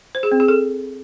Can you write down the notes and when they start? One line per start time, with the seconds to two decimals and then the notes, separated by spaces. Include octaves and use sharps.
0.15 C5
0.23 G#4
0.32 C4
0.40 G#4
0.48 A4